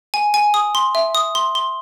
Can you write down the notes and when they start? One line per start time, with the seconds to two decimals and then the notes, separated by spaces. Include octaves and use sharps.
0.14 G#5
0.34 G#5
0.54 D#6
0.75 C6
0.95 E5
1.15 D#6
1.35 C6
1.55 C6